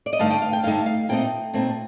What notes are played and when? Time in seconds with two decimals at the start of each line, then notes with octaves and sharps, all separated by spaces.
0.06 D5
0.13 D#5
0.19 G2 D3 A3 D#4 F5
0.30 G5
0.42 F5
0.53 G5
0.64 G2 D3 A3 D#4 F5
0.86 F5
1.09 A#2 A3 C4 D#4 G5
1.54 A#2 A3 C4 D#4